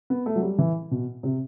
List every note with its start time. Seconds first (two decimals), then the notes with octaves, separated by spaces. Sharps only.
0.10 B3
0.26 A3
0.36 F#3
0.42 G3
0.59 E3
0.91 B2
1.23 C3